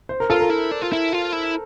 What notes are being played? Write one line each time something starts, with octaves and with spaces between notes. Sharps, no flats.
C5
A#4
F4 A4
A#4
E4
D4
F4
E4
F4
E4